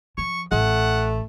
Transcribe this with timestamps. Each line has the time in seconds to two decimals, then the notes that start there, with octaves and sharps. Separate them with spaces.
0.18 F3 C#6
0.52 A1 A3 F#5